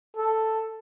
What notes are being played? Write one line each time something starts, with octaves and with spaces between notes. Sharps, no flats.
A4